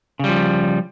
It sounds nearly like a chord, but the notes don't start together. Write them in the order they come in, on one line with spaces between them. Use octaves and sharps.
C#3 G3 F3